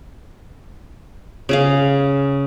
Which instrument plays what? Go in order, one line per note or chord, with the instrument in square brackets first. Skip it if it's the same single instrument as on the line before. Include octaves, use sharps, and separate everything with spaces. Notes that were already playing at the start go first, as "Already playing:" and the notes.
[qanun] C#3 G#4 F5